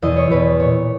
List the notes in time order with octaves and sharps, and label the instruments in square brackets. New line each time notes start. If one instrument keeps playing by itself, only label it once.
[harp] E2 B2 D#5
C#5
E2 B2 B4
A#2 C#5